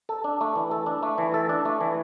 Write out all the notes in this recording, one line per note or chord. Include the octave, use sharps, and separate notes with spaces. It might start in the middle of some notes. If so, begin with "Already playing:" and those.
A4
D4
A3
E3
A4
D4
A3
E3
A4
D4
A3
E3